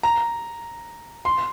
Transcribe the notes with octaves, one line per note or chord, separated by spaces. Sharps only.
A#5
C6